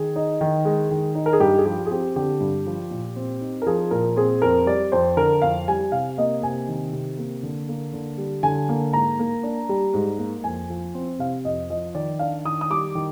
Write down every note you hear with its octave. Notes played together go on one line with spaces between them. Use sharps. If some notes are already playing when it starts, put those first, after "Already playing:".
Already playing: D#3 G#4
D#4
D#3
G#3
D#3
D#4
A#4
G#4
G2 G4
G#4
F3 G4
G#4
C4 G4
D3 G4
G2
F3
A#2
C4
D#4
A#4
F3 G#4
A#2 A#4
C4 G#4
F2 A#4
G3 D5
F2 C5
D3 A#4
F2 F5
G3 G#5
C3 F5
A#3 D#5
C3 G#5
D#3
C3
A#3
D3
A#3
D3
G3
D3 G#5
A#3
G#2 A#5
A#3
D4
G3
G#2
A#3
F2 G#5
F3
C4
C3 F5
F2 D#5
F3 D#5
D#3 D5
D4 F5
D#3 D#6
D#6
G3 D6
D#3